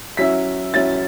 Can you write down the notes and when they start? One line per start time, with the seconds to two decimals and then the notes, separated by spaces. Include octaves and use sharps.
0.17 F#3 C#4 E4 B6
0.74 F#3 C#4 E4 A6